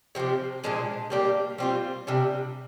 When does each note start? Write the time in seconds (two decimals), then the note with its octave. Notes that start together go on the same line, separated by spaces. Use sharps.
0.15 C3 F3 C4 G4
0.64 A#2 F3 G#3 D4
1.10 G3 A#3 D4 G4
1.58 G3 C4 F4
2.07 C3 G3 D4